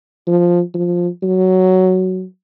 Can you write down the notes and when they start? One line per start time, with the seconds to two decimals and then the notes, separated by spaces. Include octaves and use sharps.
0.27 F3
0.74 F3
1.23 F#3